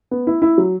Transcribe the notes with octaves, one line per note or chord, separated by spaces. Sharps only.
B3
E4
E4
F#3